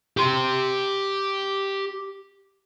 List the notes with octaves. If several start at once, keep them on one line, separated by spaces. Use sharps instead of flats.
G4 C6